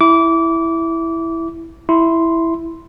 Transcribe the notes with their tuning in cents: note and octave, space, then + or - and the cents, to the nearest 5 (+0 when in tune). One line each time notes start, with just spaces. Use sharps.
E4 +0 D6 -25
E4 +0 C6 +0